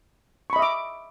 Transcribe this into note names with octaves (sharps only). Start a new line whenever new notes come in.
D#5 E5 B5 C#6 D6